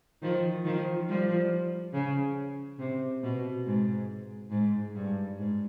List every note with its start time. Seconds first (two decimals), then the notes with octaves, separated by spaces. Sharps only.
0.22 D#3 F3
0.65 D#3 F3
1.08 F3 G3
1.93 C#3
2.79 C3
3.23 B2
3.66 G#2
4.51 G#2
4.95 G2
5.37 G#2